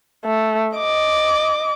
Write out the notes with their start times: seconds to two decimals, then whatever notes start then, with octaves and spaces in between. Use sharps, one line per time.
0.25 A3
0.76 D#5 D6